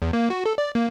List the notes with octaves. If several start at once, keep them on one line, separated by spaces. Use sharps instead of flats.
E2
A#3
F#4
A4
D5
A#3